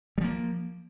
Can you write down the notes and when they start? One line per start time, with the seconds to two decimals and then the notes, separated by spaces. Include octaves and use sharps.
0.18 G3
0.21 F3
0.24 A#3